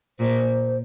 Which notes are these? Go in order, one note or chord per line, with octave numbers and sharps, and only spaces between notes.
A#2 C5